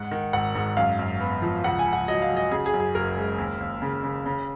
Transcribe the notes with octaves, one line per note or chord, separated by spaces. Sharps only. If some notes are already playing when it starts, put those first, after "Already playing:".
Already playing: G#2 F#5
D#3
G#1 F#5
G#2
F#2 F5
F#2
B3
F3
C#2 F#5
G#5
C#2
F#5
F#3 D#5
F5
F#3
D#5
C#3 G#4
G#4
F#2
G#4
F#1 A#4
G#3
D#2
D#2
C#3
C#3
C#3